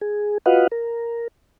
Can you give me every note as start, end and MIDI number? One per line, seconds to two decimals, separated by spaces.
0.01 0.38 68
0.46 0.67 65
0.46 0.67 66
0.46 0.67 71
0.46 0.67 75
0.46 0.67 77
0.46 0.67 78
0.72 1.28 70